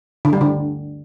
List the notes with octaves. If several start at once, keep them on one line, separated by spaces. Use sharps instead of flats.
D3
G3
D3